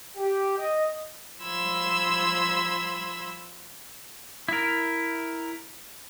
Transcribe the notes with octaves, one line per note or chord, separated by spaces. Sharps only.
G4
D#5
F3 B5 C6 E6 G#6
E4 A#4